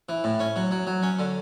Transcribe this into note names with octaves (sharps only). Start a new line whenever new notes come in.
E3
A2
C#4
F#3
F#3
F#3
C#4
D3